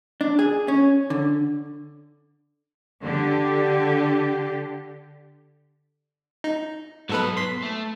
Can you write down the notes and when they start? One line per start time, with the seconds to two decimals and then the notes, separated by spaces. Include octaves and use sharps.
0.21 D4
0.39 G#4
0.68 C#4
1.10 D3
3.02 D3 G4
6.44 D#4
7.09 G#2 F#3 B3 A4 B4
7.37 C6 B6
7.63 A3